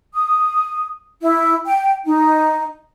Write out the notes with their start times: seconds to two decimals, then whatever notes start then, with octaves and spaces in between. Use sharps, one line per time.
0.14 D#6
1.22 E4
1.66 G5
2.06 D#4